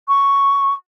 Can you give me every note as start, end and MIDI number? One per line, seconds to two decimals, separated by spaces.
0.08 0.74 85